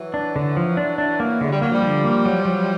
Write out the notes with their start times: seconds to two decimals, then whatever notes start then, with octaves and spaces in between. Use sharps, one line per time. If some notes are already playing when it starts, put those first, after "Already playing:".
Already playing: E3 F#3
0.14 D4
0.36 D3
0.57 F3
0.77 D4
0.98 D4
1.20 A#3
1.41 D3 G#3
1.52 G3
1.62 F#3 A#3
1.72 F3 G3
1.82 D3
2.04 A#3
2.25 F#3
2.45 F#3